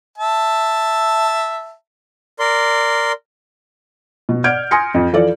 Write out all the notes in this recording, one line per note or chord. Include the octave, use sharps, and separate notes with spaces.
E5 A5
A#4 D5 C6
B2
D5 F#5 F6 G6 G#6 D7
G#5 C6 D#6 A#6 C#7
F2
E3 F3 A4 D5